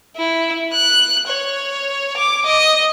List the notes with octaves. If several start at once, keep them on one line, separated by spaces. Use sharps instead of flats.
E4
F#6
C#5
D6
D#5